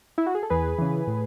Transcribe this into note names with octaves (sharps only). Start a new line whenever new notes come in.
E4
F#4
G#4
A4
E2 G#4 B4
C#3 E3
A2